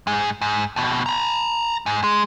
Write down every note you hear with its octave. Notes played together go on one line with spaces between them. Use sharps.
G#2 G#3
G#2
F2 B2
A#5 B5
G#2
G#3